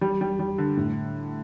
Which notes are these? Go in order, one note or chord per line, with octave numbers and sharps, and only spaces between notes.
G3
G3
G3
D3
A2